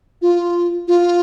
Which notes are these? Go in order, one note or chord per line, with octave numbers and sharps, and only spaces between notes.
F4
F4